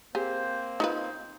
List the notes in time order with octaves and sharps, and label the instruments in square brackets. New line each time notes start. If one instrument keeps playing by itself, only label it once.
[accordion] A#3 C4 C5 [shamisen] G4 G#4
[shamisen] D#4 F4 B4